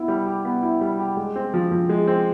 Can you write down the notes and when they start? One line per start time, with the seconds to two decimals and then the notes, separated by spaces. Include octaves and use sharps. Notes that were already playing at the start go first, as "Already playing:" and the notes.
Already playing: B3 E4
0.08 G3
0.26 G4
0.45 B3
0.63 E4
0.81 G3
0.99 G4
1.17 G#3
1.36 C4
1.54 F3
1.71 F3
1.89 G#3
2.07 C4